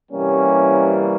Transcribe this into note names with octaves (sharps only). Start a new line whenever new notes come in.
C3 E3 G3 A#3 C#4